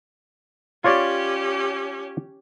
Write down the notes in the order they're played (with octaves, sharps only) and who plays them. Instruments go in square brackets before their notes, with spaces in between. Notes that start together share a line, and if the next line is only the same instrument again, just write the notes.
[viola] C#4 G4 [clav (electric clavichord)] F4 C#5 D5